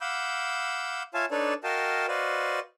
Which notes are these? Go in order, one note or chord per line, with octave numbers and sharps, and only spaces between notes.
F5 F#5 B5 D6 E6 G6
F4 C#5 E5 F5 G#5 A5
D4 D#4 A4 B4 C#5 D5
F#4 A#4 D#5 F5 G5 A5
F#4 B4 C5 D5 D#5 F5